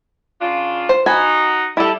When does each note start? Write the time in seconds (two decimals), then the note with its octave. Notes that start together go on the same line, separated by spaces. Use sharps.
0.40 C#3 D4 F4
0.89 C5
1.06 D#4 F#4 G#5 B5
1.77 G3 E4 A4